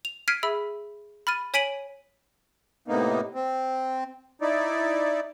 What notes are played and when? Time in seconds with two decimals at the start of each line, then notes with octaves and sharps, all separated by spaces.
0.05 F7
0.28 F6 G#6 B6 C7 D7 D#7
0.43 G#4 E5 B5 E6
1.27 B5 F6 A6 D#7
1.54 C#5 G#5 B6 D7 D#7 F#7
2.88 A2 C3 A#3 B3 D#4
3.34 C4
4.42 D#4 E4 D5